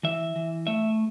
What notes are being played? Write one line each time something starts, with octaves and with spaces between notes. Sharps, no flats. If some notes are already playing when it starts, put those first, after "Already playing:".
E3 E5
E3
A3 E5